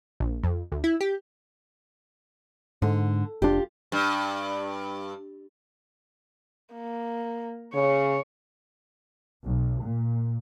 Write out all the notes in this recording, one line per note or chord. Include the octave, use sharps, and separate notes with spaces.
A#1
F2
D2
E4
G4
G#2 D3
F1 D4 F4 G4
G2
A#3
C#3 C#5
B1
A#2